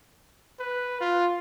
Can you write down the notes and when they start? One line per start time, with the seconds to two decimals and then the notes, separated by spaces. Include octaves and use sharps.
0.60 B4
1.01 F4